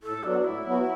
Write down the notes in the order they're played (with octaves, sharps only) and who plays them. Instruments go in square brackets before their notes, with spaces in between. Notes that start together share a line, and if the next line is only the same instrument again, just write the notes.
[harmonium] A2 [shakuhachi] A4
[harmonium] F#3 B3 F#4 [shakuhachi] D4
[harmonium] A2 [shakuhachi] E4
[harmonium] F#3 B3 F#4